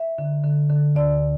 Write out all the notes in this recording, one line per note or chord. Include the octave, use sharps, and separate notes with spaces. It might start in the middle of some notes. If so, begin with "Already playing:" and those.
Already playing: E5
D3
D3
D3
D2 D5